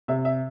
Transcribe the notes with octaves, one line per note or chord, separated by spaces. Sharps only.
C3 E5
E5